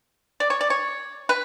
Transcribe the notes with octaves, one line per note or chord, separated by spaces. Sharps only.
D5
C#5
D5
C#5
B4